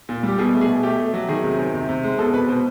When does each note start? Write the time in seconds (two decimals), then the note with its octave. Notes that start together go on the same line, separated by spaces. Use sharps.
0.09 A#2
0.23 G3 G4
0.39 B2 G#4
0.54 A3
0.61 G#4
0.68 B2
0.83 A3 G4
0.98 A3
1.14 F#3
1.29 D#3 G#4
1.43 C3
1.59 D#3
1.74 C3
1.89 C3
2.03 G#3
2.19 B2 A4
2.34 B2 B4
2.48 B2 C5